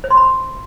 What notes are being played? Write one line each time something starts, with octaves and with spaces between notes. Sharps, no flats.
C5
C6
B5